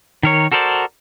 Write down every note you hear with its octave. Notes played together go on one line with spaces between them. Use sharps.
D#3 A#4 C#5
F#4 A4 A#4 C5 D5